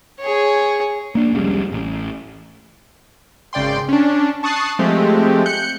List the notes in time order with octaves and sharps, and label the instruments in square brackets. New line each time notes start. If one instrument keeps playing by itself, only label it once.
[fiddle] G#4 C#5
[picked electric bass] A#3 D4
F1 C#2 C#3 G3
A1
[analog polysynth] G#1 C#3 D5 G5 C6
C#4 D4
A5 C#6 D#6 F#6 A6 C7
F3 G#3 A3 C4 G4
F#6 G6 C#7